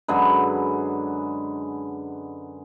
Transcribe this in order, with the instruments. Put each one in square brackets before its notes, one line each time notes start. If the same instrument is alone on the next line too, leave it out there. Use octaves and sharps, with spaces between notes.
[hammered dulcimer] F#2 D3 G#3 B4